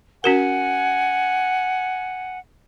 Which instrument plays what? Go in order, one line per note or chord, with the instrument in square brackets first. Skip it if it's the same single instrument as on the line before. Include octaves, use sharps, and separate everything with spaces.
[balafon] C#4 F#4 A#4 [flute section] F#5 G#5